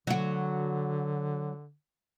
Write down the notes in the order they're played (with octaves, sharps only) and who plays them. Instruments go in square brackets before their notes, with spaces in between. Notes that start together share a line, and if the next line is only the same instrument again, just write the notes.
[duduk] D3 [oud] F#3 F#4